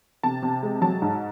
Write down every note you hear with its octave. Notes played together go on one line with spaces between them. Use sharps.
C3 A5
C3
G#3
F#3 A5
G#2